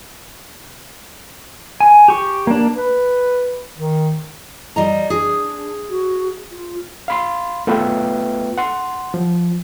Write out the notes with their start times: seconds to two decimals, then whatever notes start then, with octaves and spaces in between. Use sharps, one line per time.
1.80 G#5
2.08 G4 C#6
2.47 A#3 D4
2.76 B4
3.78 D#3
4.76 G3 D#5 A#5
5.10 D4 G#4
5.90 F#4
6.51 F4
7.08 F5 B5 C6
7.67 A3 B3 F4 B4 E5 G5
8.58 F#5 C6
9.14 F3